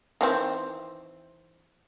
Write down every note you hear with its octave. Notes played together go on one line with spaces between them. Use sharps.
D#3 E3 C4